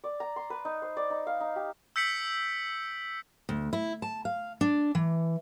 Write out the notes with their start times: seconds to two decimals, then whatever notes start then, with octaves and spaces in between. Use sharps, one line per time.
0.04 D5
0.20 A#5
0.36 C6
0.50 B4
0.65 D#4
0.82 C5
0.97 D5
1.10 D#4
1.27 F5
1.40 D#4
1.56 G4
1.96 E6 G6 B6 C#7 D7 F#7
3.49 D2
3.73 E4
4.02 A5
4.25 F5
4.61 D4
4.95 E3